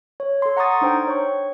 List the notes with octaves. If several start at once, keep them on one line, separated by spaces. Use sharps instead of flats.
C#5
A4 C6
F#5 A#5 C6 C#6 D#6 A6
D4 D#4 C5 G5
C#5 C#6